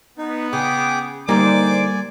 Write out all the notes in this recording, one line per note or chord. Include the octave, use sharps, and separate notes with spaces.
B3 D#4
C#3 G#4 G5 D6
D2 G3 A#3 D#4 C5 D5 G#5 D6